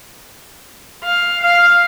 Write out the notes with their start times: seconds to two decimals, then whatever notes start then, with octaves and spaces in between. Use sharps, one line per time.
1.03 F5
1.42 F5